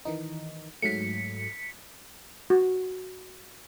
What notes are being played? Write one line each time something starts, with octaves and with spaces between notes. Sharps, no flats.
D#3 E3 D#4
G#2 F#3 A3 B6 C#7
F#4